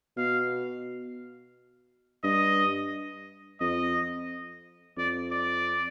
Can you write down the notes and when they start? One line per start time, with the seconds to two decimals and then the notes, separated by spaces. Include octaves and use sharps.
0.17 B2 F5
2.23 G2 D#5
3.61 F2 D#5
4.97 F2 D5
5.31 D5